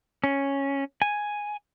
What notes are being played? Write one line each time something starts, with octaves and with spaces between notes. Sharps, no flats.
C#4
G#5